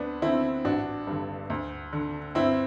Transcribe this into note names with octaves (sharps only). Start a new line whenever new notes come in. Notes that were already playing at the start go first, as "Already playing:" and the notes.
Already playing: D2 B3 D4
D3 C4 E4
A1 D4 F#4
G2 D3
D2
D3
G1 C4 E4